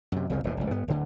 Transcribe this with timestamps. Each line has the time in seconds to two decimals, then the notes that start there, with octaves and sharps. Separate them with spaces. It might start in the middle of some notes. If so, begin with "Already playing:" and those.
0.12 F#2 C3
0.30 C2 F2 C#3 F3
0.44 D#1 E2 A2
0.57 F1 C#2
0.71 G2 B3
0.88 D1 D3